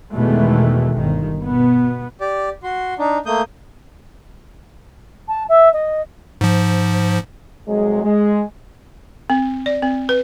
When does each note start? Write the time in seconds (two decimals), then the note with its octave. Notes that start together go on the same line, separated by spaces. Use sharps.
0.14 E2 B2 D#3 E3 G#3 A3
0.92 G1 D#3
1.43 B2 B3
2.21 G4 D5
2.63 F#4 C6
2.99 D4 D#4
3.26 A3 A#3 D#6 G6
5.28 A5
5.49 E5
5.73 D#5
6.41 G#2 F3
7.67 C2 C3 F#3 G#3
8.03 G#3
9.30 C4
9.66 D5
9.82 C4
10.09 B4